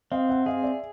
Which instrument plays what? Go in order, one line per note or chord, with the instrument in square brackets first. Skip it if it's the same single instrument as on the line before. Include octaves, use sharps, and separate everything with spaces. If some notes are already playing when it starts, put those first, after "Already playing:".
[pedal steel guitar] C4 [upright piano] D#5 F5
[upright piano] E5 F#5
[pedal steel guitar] G#4 [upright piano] D#5 F5
[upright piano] D5 E5